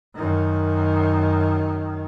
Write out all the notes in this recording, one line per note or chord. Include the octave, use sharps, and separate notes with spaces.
F#2 D#3